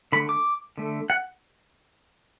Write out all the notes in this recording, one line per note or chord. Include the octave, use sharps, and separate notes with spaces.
D3 A3 B5
D6
D3 A3
F#5